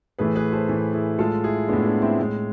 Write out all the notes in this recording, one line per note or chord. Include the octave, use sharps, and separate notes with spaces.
A2 E3 A3 G#4 B4
G#4 B4
A4 C5
A2 E3 A3
E4 G#4
A2 G#3 F4 A4
E4 G#4
A2 G#3 B3 D4
B3 D4
C4 E4
A2 G#3